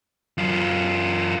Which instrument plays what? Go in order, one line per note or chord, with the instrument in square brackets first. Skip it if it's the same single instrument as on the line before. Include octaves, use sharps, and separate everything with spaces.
[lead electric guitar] F#2 F4